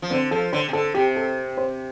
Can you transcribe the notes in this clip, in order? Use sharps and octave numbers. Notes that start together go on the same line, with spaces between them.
F3
D3 C4
F3 A4
D3 C5
C3
D3 A4
C3 G4
A4
C5